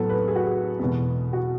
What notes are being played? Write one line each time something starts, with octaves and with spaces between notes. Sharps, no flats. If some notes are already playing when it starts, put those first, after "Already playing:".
Already playing: A2 F#3 B3 A4
B4
G#4
F#4
G#4
E2 B2 G#3 B3
F#4